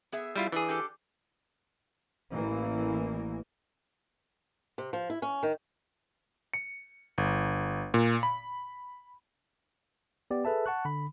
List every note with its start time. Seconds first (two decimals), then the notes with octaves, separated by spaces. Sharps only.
0.12 B3 G#4 E5
0.36 G3 E4 F4
0.52 E3 D4 G#4 D5
0.69 D4 G4 A4
2.33 A1 E3 A#3
4.78 C3
4.93 F3
5.10 E4
5.22 C#4
5.43 D#3
6.54 C#7
7.18 G1
7.94 A#2
8.23 B5
10.31 B3 G4 D5
10.45 G#4 A4 B4 E5 A5
10.66 F#5 A5 C#6 F#6
10.85 D3 B5